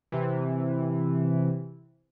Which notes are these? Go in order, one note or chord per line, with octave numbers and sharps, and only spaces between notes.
C3 E3